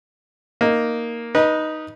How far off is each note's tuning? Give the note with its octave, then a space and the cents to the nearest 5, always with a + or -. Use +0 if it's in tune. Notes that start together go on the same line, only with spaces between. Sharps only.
A#3 +0 D#4 +0
D#4 +0 B4 -25